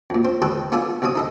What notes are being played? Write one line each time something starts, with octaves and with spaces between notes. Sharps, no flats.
F2 A#2
C4 C5
D#3 G3 C4 A4 B4 C5
B3 F4 A4 D5 G#5
B1 C3 G3 C4 D#6
D#4 A4 D#5